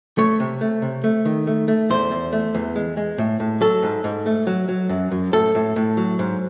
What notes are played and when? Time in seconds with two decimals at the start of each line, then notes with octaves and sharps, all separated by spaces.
0.18 A3 C#5
0.40 C3
0.61 A3
0.82 C3
1.04 A3
1.25 D#3
1.47 A3
1.68 A3
1.90 E2 C5
2.11 E2
2.33 A3
2.54 E2
2.76 G#3
2.97 G#3
3.18 A2
3.40 A2
3.61 F#3 A4
3.83 G#2
4.04 G#2
4.26 A3
4.47 F#3
4.69 F#3
4.89 F#2
5.12 F#2
5.33 A2 A4
5.55 A2
5.76 A2
5.97 F#3
6.19 G#2